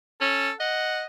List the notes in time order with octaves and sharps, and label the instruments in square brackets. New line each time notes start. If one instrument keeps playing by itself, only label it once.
[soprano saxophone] C#4 [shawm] A4
[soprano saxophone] D#5 [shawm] F#5